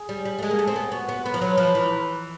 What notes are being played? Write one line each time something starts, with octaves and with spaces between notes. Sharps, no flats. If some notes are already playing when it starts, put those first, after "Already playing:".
Already playing: G#4
G3
G3
A3
G#3
A#3
A3
C4
B3
B3 F#4
B3
B3 B4
F3
F#3
F3
E3